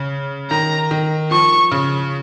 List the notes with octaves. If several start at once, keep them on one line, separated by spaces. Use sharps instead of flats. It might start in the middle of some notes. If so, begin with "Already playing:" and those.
Already playing: C#3
D#3 A#5
D#3
F3 C#6
C#3